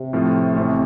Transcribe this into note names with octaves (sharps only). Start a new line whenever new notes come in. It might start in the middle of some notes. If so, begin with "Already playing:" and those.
Already playing: C3
A2 F3 A3 C4 F4
A1 A2 C3 A3 C4